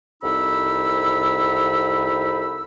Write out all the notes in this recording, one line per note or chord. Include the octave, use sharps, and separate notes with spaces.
C2 F2 D#4 B5 E6